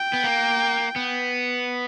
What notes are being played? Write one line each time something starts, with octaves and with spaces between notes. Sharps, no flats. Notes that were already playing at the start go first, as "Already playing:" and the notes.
Already playing: G5
B3
A#3
B3